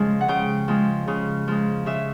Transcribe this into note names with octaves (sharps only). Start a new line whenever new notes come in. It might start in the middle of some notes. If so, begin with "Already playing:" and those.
Already playing: C#3 F3 G#3
F#5
C#3 G5
F3 G#3
C#3
F3 G#3
C#3 E5